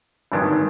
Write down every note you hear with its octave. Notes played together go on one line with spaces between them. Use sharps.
G#1 G2 D#3